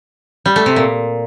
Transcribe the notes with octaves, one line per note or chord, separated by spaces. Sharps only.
G3
A3
C3
A#2